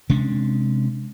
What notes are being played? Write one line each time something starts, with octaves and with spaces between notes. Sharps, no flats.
C3 G#3 C#4 D4